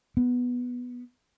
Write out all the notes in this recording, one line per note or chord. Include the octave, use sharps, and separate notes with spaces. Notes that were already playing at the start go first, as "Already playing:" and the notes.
B3